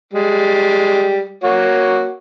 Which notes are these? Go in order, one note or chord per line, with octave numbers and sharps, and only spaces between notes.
G3 G#3
A#3 F#4 C#5